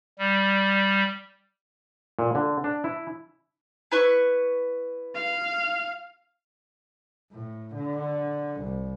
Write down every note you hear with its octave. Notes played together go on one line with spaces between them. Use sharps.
G3
A#2
D3
D4
E4
E4 B4 C#6
F5
A2
D3
C2